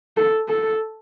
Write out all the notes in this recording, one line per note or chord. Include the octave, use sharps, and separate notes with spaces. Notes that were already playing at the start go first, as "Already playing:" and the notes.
A4
A4